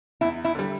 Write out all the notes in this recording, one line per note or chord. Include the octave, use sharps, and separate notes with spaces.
E2 E4
E4
D3 G3